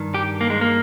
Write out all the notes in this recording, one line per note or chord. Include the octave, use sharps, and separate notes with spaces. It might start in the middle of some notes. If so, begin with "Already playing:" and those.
Already playing: G2 D#3
G4
A#3
G#3
A#3